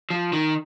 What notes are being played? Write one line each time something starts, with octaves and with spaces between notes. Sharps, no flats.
F3
D#3